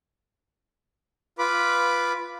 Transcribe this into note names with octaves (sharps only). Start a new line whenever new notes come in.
F4 B4 B5 D6